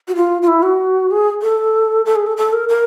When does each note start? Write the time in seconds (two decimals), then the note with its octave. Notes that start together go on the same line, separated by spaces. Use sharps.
0.08 F#4
0.15 F4
0.42 F4
0.48 E4
0.63 F#4
1.11 G#4
1.42 A4
2.06 A4
2.16 G#4
2.27 A4
2.37 A4
2.53 A#4
2.69 A#4